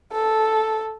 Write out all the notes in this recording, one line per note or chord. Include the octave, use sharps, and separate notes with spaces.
A4